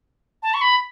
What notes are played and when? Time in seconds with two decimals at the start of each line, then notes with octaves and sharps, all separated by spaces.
0.43 A5
0.54 C#6
0.61 B5